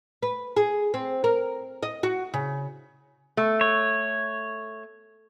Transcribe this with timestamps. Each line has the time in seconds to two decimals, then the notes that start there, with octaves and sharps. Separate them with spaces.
0.22 B4
0.57 G#4
0.94 C4
1.24 A#4
1.83 D#5
2.03 F#4
2.34 C#3
3.37 A3
3.61 C#5